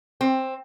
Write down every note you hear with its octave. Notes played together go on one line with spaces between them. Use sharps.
C4